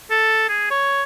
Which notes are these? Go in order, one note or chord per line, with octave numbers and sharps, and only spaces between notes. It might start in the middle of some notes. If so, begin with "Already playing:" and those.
A4
G#4
C#5